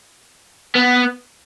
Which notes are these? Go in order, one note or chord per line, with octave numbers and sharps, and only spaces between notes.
B3